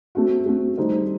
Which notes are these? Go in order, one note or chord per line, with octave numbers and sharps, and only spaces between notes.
A3 C4 F#4
A3 C4 F#4
D#3 G3 D#4 A4 C5